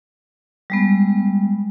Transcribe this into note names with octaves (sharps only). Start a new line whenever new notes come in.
G3 G#3 B3